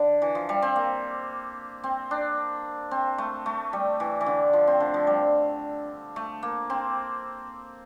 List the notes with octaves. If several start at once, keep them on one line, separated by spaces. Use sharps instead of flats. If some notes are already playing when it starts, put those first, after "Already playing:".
Already playing: D3
E3
F3
G3
C4
A#3
C4
D4
C4
A3
A3
G3
E3
E3
D3
F3
C4
D3
F3
G3
A3
A#3
C4